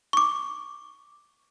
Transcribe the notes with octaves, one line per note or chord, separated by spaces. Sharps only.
C#6 D6